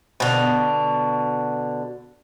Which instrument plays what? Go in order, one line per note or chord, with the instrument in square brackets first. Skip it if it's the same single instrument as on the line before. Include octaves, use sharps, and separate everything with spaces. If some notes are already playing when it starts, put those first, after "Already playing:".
[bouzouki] B2 D3